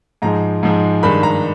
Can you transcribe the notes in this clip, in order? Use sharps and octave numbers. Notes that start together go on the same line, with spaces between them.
G#2 F3 G#3 A#5
G#2 F3 G#3
G2 D#3 G#3 B5
A#5